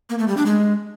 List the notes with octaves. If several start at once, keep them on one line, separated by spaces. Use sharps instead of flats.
A#3
A3
G3
D4
G#3